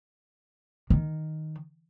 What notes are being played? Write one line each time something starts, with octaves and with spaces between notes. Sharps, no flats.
D#3